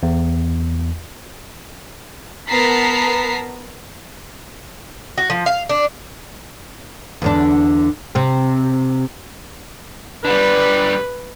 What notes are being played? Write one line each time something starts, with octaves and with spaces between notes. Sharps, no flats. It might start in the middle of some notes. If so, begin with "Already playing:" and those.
E2
B3 A#4 A5 A#5 B6 C7
F#4
F3
F5
D4
E2 D3 D4
C3 C4
D3 G3 B4